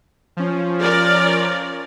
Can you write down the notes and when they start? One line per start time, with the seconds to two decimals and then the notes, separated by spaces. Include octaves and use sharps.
0.37 F3 C#4
0.80 A#4 D5